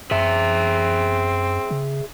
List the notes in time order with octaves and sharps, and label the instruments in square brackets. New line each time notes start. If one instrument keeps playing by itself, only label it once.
[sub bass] F#2 [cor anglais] C4 [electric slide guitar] G#4 E5
[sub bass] C#3